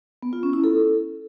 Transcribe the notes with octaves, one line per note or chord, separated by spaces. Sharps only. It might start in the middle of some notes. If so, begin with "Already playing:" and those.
B3
F4
C#4
E4
A4